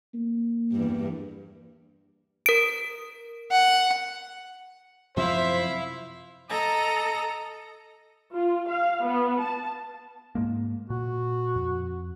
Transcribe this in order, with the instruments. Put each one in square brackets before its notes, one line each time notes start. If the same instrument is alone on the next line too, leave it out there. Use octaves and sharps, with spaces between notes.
[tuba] A#3
[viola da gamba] E2 G2
[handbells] A#4 D7
[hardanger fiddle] F#5
[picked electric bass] F#2 C3 F3 [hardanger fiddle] E4 F5 [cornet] C5 [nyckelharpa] E5
[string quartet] A4 D#5 A#5 A#6
[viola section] F4
F5
B3
A5
[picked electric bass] G#2 G#3 A#3
[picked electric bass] A#2 [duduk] F#4
[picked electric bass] F2